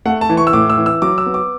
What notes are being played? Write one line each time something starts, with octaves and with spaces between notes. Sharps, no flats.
A3 F#5
A5
E3
C#6
E6
A2 D6
E6
E3
E6
F#3 D6
E6
B3
D6